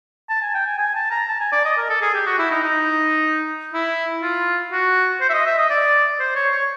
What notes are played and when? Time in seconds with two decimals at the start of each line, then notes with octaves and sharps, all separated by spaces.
0.29 A5
0.42 G#5
0.54 G5
0.66 G#5
0.79 G#5
0.95 A5
1.11 A#5
1.28 A5
1.40 G#5
1.52 D5
1.65 D#5
1.77 A#4
1.89 A4
2.01 G#4
2.14 G4
2.27 F#4
2.38 E4
2.51 D#4
2.63 D#4
3.74 E4
4.22 F4
4.72 F#4
5.21 C5
5.30 E5
5.33 D#5
5.46 E5
5.58 D#5
5.70 D5
6.20 C5
6.35 C#5
6.52 C#5